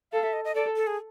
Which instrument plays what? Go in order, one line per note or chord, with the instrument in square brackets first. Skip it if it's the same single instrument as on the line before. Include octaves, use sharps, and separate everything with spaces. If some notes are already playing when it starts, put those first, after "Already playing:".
[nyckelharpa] A4 [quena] F5
[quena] E5
D#5
D#5
[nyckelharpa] A4 [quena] D5
[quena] A4
G#4